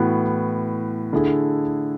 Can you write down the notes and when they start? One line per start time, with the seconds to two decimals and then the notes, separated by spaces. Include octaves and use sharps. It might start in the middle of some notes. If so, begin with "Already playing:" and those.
Already playing: A2 E3 B3 F#4
1.13 D3 A3 E4 G#4